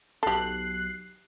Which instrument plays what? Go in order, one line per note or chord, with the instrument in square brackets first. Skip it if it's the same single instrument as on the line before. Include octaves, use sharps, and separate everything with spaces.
[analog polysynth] B1 F#6 C7 [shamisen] G4 A4